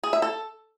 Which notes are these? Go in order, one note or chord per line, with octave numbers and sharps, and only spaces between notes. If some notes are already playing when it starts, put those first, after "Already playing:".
G#4
E5
A4